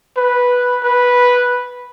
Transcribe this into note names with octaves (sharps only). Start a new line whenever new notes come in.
B4
B4